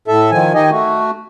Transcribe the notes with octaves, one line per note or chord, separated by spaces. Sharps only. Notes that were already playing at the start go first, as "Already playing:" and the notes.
A2 A4 E5
D#3 F3 G#5
D#3 D#4 G4 D#5 G#5
A3 F#4